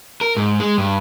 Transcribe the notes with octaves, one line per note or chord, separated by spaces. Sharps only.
A#4
G#2
G#3
G2